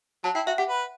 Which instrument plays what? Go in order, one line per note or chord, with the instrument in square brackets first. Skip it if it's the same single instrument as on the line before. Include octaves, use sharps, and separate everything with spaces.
[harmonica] F#3 [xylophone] A5
[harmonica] E4 [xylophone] G5
[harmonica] F#4 [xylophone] E5
[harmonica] G4 [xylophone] F#5
[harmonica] B4